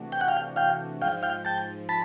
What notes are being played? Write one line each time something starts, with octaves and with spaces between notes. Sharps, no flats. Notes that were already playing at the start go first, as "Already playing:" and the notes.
Already playing: C3 E3 A3 D4 F#4
G5
F#5
F5 G5
F5 G5
G#2 F3 G#3 F5 G5
F5 G5
G5 A5
A5 B5